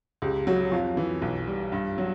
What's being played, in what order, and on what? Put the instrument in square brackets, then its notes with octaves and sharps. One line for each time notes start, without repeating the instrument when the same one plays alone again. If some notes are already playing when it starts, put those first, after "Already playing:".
[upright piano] C#2 [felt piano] G4
[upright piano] F#3 [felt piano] F#4
[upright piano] F2 [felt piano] F4
[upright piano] E3
B1
G3
G2
F#3